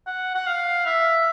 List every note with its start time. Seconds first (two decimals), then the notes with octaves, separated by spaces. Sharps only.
0.07 F#5
0.35 F#5
0.47 F5
0.86 E5